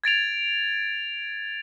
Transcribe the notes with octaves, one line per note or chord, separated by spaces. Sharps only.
G#6 A6 D7 F7